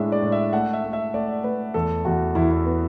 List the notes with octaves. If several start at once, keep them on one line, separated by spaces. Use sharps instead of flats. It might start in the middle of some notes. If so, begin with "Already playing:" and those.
Already playing: A2 G#3 D4 E5
D5
A2
E5
A3 F#5
E5
A3
E5
A3 D5
A3 B4
E2 A4
E2 F#4
E2 E4
E4
B3